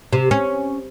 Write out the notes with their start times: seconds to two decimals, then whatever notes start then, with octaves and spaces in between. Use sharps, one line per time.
0.13 C3
0.31 C#4